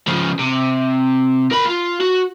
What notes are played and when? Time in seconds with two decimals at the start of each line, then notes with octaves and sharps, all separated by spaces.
0.07 C#3 F3
0.39 C3
1.51 A#4 B5
1.65 F4
2.01 F#4